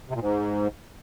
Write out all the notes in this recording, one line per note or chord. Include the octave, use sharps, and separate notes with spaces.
C3
A#2
G#2